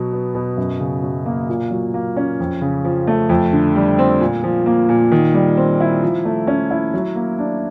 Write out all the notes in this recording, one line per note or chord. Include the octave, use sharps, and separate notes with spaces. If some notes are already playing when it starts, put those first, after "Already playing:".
Already playing: B2 F#3
B3
B2
F#2
C#3
F#3
A#3
A#2
F#3
A#3
C#4
F2
C#3
F3
A3
F2
D3
G3
C4
A#2
F3
A#3
A#2
D#3
G3
C4
E4
F3
A3
C#4
E4
F#3
A#3
D4